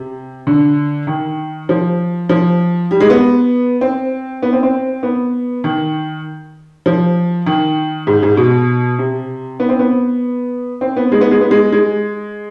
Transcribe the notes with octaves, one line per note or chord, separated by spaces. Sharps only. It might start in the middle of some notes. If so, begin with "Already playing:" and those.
Already playing: C3
D3
D#3
F3
F3
G3
G#3
B3
C4
B3
C4
C4
B3
D#3
F3
D#3
G#2
G#2
B2
C3
B3
C4
B3
C4
B3
G#3
B3
G#3
B3
G#3
G#3